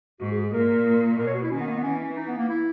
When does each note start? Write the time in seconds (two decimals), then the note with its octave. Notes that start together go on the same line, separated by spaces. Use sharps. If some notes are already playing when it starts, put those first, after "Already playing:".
0.20 G#2 F#4
0.31 G#4
0.41 G#4
0.52 A#2 A#4
1.18 B2 A#4
1.26 C#5
1.34 F#4
1.43 E4
1.51 D#3 C#4
1.60 B3
1.67 A#3
1.76 B3
1.83 E3 C#4
1.99 C#4
2.16 D#4
2.27 B3
2.38 A#3
2.49 E4